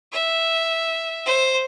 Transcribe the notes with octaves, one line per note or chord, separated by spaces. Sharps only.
E5
C5